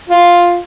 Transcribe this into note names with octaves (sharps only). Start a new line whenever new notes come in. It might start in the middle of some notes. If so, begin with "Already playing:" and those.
F4